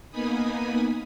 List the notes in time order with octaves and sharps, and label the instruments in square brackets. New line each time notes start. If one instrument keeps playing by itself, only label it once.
[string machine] A#3 B3 D#4 G#5 B5 D#6